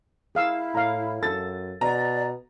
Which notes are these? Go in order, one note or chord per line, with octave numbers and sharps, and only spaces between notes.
E4 G#4 F5 E6
A2 F5 A#5
F#2 A4 A6
B2 D5 A#5